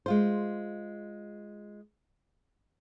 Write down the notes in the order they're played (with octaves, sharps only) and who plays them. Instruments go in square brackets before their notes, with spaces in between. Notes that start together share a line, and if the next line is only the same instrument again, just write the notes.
[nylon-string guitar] G#3 F4 C5